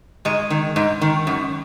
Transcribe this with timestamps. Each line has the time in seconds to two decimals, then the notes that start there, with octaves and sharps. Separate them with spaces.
0.25 G#2 G#3
0.50 D#3
0.76 G#2
1.01 D#3
1.27 F#2